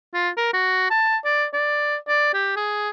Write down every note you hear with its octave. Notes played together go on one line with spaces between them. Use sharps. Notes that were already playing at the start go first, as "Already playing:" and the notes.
F4
A#4
F#4
A5
D5
D5
D5
G4
G#4